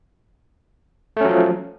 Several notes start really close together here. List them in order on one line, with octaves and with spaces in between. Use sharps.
A3 C#4 F#3 F3